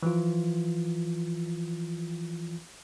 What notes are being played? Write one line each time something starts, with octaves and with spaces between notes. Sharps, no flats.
E3 F3 F4